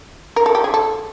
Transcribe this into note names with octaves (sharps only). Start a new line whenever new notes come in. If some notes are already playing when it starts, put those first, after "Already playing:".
A#4
A4
G4
G#4
A4